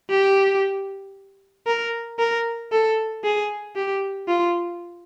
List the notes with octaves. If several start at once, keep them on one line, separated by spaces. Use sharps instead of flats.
G4
A#4
A#4
A4
G#4
G4
F4